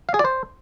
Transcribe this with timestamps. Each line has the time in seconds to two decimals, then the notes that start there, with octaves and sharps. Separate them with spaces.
0.09 F5
0.14 G#4
0.19 D5
0.25 C5